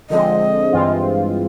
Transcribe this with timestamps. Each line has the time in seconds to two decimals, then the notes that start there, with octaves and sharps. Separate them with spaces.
0.10 D3 F3 G#3 C4 D#5
0.72 G2 E3 G#3 C4 F4